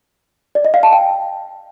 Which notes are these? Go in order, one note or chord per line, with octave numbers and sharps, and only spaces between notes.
D5
D#5
F5
A5
G5